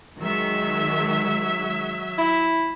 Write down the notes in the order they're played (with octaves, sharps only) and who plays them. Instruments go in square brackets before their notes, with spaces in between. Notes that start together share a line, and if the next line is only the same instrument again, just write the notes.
[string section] D#3 G#3 [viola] F#3 E5
[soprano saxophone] E4